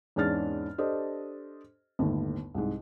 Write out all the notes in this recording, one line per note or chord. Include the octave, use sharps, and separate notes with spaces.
E2 G#2 C#4 D4 F6 A6
D4 G4 A4 C5 D#5
G1 D#2 A2
C2 G#2